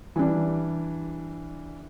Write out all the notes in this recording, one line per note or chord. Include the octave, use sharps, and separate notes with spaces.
E3 G3 D4